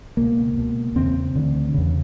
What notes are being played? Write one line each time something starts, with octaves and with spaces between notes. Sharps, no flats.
C#2 B2 A#3
C#2 B2
E2 C#3 C4
D2 D3
E2 C#3